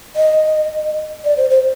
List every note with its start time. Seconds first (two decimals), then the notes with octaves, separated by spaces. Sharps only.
0.16 D#5
1.24 D5
1.37 C5
1.50 C5